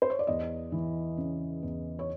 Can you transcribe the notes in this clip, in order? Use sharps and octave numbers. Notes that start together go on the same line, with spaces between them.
C5
C#5
D5
E2 D#5
E3
C#3
E2
C#5